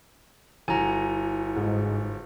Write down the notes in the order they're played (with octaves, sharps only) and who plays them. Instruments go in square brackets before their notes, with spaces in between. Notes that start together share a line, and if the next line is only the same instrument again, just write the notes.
[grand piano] G1 F#4 [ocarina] E4 [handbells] G#5 A#5
[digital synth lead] G#2